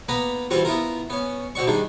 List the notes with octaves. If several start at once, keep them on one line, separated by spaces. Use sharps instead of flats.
A#3 B3 B4 A#5 B5
E3 G3 C4 F4 F#4
B3 E4 F4 A#4
B3 C#4
B2 C4 F#4 D5 C#6
D#3 G3 G#3 D4